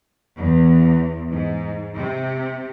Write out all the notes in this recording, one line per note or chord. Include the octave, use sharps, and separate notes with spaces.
E2
G#2
C3